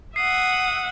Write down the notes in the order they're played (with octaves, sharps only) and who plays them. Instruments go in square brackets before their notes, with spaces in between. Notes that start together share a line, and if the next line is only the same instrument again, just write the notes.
[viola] E5 F#5 [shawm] D#6 [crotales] C7